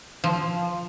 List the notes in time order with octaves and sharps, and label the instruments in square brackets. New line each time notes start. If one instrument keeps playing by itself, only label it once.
[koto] F3